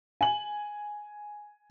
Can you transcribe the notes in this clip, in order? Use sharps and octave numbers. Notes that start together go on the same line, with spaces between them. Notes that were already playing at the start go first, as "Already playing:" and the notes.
G#5 F#7